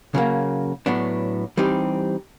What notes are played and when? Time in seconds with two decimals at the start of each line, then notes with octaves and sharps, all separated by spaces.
0.15 C#3 F#3 A#3
0.86 A2 F#3 B3 D4
1.57 E3 G3 C4 D#4 G4